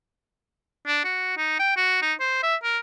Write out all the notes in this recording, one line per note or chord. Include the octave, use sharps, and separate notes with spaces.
D4
F#4
D#4
G5
F#4
D#4
C5
E5
A#4